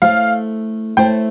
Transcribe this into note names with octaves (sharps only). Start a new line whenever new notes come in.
A3 E4 A4 C5 F5
A3 E4 A4 C5 G5